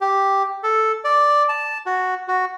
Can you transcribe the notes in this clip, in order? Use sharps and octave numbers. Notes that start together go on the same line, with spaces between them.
G4
A4
D5
A5
F#4
F#4